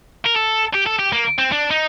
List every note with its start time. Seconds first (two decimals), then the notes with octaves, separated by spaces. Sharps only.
0.25 A#4
0.35 A4
0.74 G4
0.86 A4
0.99 G4
1.13 A#3
1.38 C4
1.52 D4
1.71 D#4